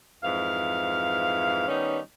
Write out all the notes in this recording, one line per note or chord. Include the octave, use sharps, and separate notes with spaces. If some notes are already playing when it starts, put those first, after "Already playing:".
F2 G#2 E3 F5
D#3 G3 B3 C#4 D#4